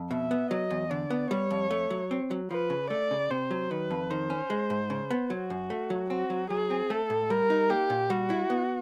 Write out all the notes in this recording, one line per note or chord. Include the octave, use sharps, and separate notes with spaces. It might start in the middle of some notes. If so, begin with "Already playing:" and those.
Already playing: F2
B2 E5
B3
F#3 D#5
E2
D3 D5
B3
G3 C#5
F2
A3
F#3
C4
F#3
F3 B4
C#3
A3 D5
C#3
C3 C5
F#3
D#3 B4
F2
D#3 C5
C#4
G#3
G#2
C#3
B3
F#3 F#4
F#2
A3
F#3
C4 F#4
F#3
F#3 G#4
C4
A3 A4
A2
G3 A#4
D#4
A#3 G4
A#2
G3 F#4
E4
B3